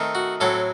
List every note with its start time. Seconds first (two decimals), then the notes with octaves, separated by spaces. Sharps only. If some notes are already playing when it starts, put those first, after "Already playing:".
Already playing: D#3 A3 C4
0.15 F#4
0.40 A2 F#3 C4 A4